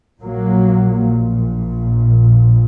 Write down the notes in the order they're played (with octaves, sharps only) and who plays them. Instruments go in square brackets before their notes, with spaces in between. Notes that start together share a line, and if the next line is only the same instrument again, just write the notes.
[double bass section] A#1 A#2 F#3 A#3